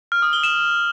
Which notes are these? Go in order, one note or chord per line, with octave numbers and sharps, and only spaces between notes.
F6
D#6
G7
E7